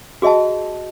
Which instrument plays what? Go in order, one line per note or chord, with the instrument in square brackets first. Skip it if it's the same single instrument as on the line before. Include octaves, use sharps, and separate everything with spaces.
[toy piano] F#4 G#4 D#5 E5 A5